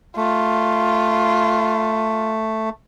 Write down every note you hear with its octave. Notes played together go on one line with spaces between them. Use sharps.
A3 F4